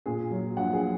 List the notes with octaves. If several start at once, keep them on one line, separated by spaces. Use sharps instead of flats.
A#2 G#4
F#3
A#1 F#5
G#4